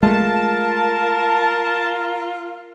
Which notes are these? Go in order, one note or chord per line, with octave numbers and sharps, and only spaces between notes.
G#3 A3 F4 A#4 A5